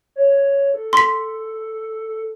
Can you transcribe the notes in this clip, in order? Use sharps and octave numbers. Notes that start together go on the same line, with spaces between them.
C#5
A4
C6 B6